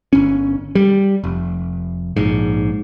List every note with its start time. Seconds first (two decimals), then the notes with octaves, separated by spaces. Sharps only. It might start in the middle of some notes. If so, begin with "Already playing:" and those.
0.13 G1 C#4
0.75 G3
1.24 F1
2.16 A#1 G#2